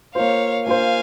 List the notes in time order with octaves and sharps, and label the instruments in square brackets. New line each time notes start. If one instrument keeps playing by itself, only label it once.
[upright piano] A#3 F4 C5 [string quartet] C#5 F5
[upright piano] A#3 F4 C5 [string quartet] F5 G#5